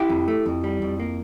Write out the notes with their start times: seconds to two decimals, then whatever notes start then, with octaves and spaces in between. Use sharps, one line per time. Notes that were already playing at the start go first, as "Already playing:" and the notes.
Already playing: E4 G4
0.09 F2
0.28 A3
0.46 F2
0.64 G3
0.82 F2
1.00 A#3